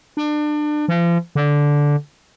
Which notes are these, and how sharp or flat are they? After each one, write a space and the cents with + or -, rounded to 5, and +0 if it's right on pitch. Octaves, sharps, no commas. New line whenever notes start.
D4 +30
F3 -40
D3 -10